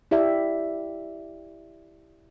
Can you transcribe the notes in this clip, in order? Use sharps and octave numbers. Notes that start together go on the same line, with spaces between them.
E4 G4 D5 E5